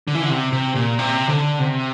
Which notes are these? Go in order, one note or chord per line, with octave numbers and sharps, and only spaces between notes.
D3
E3
D3
C3
C3
A#2
C3
D3
C3